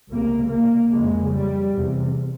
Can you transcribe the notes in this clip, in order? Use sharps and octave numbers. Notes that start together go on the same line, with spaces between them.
C#2 C3 A#3
A#3
F2 C#3 G#3
G3
E2 C3